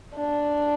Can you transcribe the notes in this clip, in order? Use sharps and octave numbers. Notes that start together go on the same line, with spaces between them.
D4